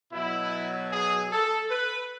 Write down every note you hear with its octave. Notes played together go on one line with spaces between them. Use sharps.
B2 F#3 E4
G#4
A4
B4